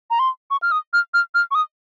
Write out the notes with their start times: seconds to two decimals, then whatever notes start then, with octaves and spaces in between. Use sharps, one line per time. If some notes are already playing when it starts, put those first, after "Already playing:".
0.10 A#5
0.19 C6
0.51 C#6
0.62 F6
0.72 D#6
0.93 F6
1.14 F6
1.35 F6
1.51 C#6
1.55 D#6